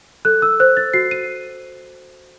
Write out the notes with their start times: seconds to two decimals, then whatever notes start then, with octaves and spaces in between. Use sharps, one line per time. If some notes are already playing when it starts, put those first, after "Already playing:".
0.25 A4 F#6
0.42 E6
0.60 C5 F#6
0.77 A6
0.94 F#4 C7
1.11 D#7